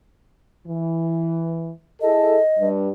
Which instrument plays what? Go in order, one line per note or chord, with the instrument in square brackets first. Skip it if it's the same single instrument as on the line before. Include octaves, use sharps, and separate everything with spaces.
[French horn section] E3
[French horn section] E4 G#4 A4 [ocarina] D#5
[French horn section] G2